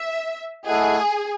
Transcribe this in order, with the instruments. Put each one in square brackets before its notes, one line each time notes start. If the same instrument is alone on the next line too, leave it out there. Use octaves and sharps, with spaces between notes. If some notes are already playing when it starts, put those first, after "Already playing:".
Already playing: [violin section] E5
[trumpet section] A3 E4 A4 D#5 F#5 [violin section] G#4